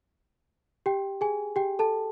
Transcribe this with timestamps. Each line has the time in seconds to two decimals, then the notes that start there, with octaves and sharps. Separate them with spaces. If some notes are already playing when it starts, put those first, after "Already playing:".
0.86 G4 G5
1.21 G#4 G#5
1.56 G4 G5
1.79 A4 A5